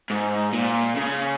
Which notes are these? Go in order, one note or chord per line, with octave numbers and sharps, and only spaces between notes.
G#2
A#2
C#3